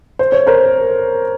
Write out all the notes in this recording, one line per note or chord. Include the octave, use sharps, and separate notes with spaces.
C5
C#5
A#4 C5